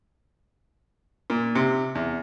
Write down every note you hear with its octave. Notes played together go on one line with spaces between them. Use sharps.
A#2
C3
E2